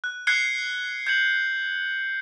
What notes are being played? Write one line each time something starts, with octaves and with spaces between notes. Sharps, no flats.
F#6
F#6 G#6 C7 C#7 G7
G6 G#6 C#7 F#7